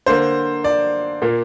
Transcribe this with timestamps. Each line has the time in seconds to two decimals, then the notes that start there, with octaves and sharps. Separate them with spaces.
0.06 D3 A#3 C5
0.64 D5
1.22 A#2 A#3